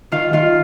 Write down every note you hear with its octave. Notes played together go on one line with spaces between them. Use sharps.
D#3 F4 F5
D#3 F4 F5